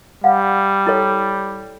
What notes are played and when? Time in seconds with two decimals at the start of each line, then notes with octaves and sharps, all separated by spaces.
0.24 G3 F5 F#5
0.87 E4 A4 C#5